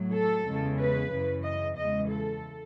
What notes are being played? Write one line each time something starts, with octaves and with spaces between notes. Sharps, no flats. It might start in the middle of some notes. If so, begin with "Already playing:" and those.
Already playing: A2 F#3
A4
E2 C#3 G#3
B4
F#2 C#3 E3
D#5
E2 C#3 E3 G#3 D#5
A4